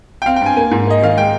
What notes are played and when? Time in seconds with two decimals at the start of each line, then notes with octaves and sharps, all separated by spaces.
0.22 G5
0.26 C4 F5
0.36 G5
0.41 G2 G#5
0.57 A#3 G#5
0.71 G#2
0.87 A#3 D#5
1.02 D#3 F5
1.18 G#3 G5